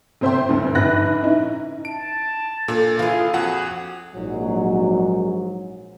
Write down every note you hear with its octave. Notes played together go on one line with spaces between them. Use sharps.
G1 C3 C5 E5 G5 C6
D2 G2
A#1 G#2 D3 B4 F#6 A#6
C#4 D#4 E4
A5 D7
A#2 D4 A4
E3 F4 G#4 F5
F2 F#4 G#4 F#5
A#1 G#2 F#3